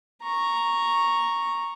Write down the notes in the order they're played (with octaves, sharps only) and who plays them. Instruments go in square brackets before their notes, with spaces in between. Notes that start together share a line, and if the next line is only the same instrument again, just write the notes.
[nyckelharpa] A#5 C#6